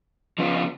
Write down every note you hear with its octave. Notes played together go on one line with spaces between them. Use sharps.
C#3 F3 B3 F4